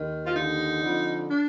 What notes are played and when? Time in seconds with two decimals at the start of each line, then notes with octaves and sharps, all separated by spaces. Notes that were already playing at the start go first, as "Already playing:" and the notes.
Already playing: D#2 D#3
0.26 F4
0.35 D#2 D3 D#4
0.82 F2 D3
1.30 D4